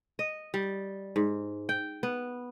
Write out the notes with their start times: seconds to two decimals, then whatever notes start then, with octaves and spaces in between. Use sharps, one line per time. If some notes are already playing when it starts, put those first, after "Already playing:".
0.19 D#5
0.54 G3
1.16 G#2
1.69 G5
2.03 B3